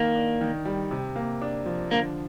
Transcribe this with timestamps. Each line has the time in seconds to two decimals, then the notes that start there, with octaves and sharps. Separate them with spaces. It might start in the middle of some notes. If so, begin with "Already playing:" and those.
Already playing: D#3 A#3
0.15 D4
0.41 D#3
0.65 G3
0.91 C3
1.16 A#3
1.42 D4
1.66 F3
1.91 D3 A#3